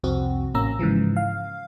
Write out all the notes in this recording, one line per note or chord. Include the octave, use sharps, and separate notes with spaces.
C2 F2 C4 F#4
A1 A#3 C#4 A#5 E6
G#2 C#3 E3 F3
F5